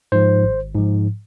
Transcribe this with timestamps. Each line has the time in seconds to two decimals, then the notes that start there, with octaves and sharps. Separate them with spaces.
0.12 G#2 F3 C5
0.43 G#1
0.75 G#2 F3